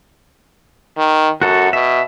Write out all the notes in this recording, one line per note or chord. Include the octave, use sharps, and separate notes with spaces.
D#3
F#2 F#4 A4
B2 E5